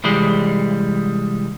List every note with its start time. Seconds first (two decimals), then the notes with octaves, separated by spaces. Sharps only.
0.04 C2 E3 G3 G#3